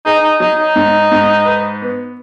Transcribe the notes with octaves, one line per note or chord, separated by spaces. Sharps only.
D#4 G#4
D#4
F#3 D#4
D#4
G#2
G#2
B4
B3